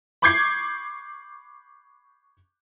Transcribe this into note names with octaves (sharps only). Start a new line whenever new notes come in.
B5 C#6 D6 G6 G#6 C7